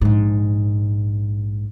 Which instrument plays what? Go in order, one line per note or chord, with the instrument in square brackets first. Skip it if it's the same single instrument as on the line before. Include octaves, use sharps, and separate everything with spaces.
[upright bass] A#1 G#2